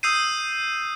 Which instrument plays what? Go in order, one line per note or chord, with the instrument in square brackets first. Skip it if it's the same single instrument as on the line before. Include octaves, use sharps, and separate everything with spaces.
[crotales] D#6 E6 G6 C7 D#7